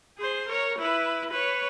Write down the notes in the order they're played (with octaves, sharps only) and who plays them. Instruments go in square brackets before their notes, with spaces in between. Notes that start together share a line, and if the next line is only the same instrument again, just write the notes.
[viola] G#4 C5
A#4 C#5
E4 B4
B4 C#5